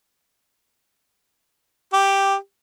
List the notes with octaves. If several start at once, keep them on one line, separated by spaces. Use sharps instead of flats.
G4